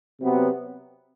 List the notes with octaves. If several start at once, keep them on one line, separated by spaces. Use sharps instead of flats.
C3 F#3 B3